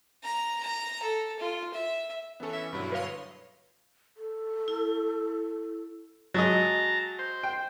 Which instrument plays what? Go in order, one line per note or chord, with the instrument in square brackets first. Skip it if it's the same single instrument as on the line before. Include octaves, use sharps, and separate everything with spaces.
[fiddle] A#5
A#5
A4
F4
E5
[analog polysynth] E3 C#4 [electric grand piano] B3 A4
[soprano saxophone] E5
[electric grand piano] G2 F#3 [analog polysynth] B2 D3 [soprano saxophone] E4
[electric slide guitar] B4 F5 [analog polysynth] C#5 D#5 C6
[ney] A4
[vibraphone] E4
[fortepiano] F#3 G#3 D#5 [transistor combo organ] A5 A#5
[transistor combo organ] C5
[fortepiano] G5